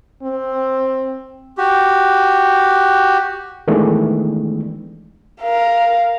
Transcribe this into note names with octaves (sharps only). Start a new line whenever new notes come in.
C4
F#4 G4
D#3 E3 G#3 A3 B3 D4
A#4 F5